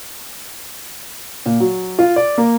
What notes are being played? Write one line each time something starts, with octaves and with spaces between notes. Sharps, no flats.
A#2
F#3
F4
D5
A#3